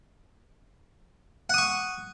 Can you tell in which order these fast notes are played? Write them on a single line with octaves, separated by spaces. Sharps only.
F#5 D#6 C#6